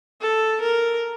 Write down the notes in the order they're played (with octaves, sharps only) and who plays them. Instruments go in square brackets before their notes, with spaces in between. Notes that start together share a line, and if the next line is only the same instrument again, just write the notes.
[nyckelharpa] A4
A#4